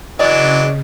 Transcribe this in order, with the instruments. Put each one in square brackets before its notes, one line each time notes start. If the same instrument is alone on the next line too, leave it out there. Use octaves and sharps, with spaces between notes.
[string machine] C#3 [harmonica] E3 F#3 D4 [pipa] G#4 D5 [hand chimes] D#5